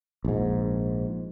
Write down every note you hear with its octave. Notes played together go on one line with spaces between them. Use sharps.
A#1 G#2